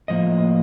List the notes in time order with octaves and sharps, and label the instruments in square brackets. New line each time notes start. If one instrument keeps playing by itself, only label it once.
[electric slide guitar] A2 F3 A#3 D#5